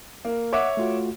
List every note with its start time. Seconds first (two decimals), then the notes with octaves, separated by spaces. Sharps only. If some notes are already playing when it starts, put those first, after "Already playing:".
0.25 A#3
0.53 C#5 D#5 E5 F#5 D6
0.77 A3 F4 F#4